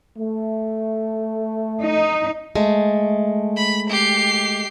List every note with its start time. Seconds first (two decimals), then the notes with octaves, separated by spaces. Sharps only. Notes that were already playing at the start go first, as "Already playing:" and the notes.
0.17 A3
1.82 D#4
2.56 G#3 A3
3.57 B5
3.90 G4 C7